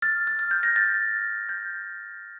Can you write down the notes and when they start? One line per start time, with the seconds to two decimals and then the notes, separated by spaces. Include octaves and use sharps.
0.02 F6 A6
0.27 F6
0.39 F6
0.51 G6
0.63 G6 A#6
0.76 F6 A6
1.49 G6